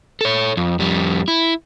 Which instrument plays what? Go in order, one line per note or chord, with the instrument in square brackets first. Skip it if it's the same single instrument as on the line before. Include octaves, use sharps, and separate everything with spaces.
[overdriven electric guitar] A4 C#5
F2
F2 G3
E4